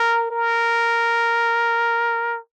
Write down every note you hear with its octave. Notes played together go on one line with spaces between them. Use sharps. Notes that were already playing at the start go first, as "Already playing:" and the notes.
Already playing: A#4
A#4